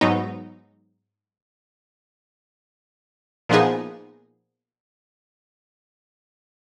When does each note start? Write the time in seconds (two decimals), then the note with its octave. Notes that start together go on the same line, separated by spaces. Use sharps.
0.01 G#2 F#3 B3 D#4
3.49 A#2 F3 B3 D#4 G#4